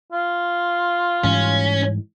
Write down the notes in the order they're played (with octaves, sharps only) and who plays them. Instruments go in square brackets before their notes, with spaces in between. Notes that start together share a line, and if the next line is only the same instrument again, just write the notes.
[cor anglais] F4
[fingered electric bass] G#2 E3 G3 [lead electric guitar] C#4